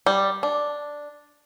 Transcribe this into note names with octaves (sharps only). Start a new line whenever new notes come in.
G3
D4